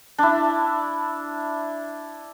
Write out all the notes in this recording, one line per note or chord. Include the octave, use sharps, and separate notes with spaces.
D4 E4